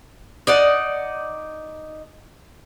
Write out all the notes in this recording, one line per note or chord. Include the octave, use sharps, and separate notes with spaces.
D#4 D5 F#5